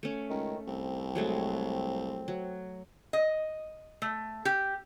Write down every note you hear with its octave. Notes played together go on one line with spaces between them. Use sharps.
A3 C#4
C#2 D#3
C2 C4
F#3 G#3 A3
F#3
D#5
A3
G4